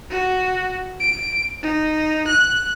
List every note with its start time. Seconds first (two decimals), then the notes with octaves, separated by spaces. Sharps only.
0.11 F#4
1.00 D7
1.63 D#4
2.27 F#6